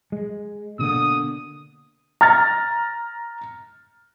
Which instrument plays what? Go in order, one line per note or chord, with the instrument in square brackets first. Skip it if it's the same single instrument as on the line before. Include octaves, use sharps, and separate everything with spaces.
[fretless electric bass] G#3
[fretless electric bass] B2 D3 A#3 [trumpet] D#6
[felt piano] A#5 F6 A6